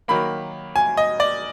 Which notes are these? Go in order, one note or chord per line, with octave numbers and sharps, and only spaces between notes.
D#3 F#3 A#3 B5
G#5
D#5
D5